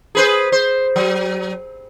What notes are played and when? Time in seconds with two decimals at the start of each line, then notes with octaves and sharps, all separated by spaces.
0.15 G#4 B4 C5
0.52 C5
0.96 F#3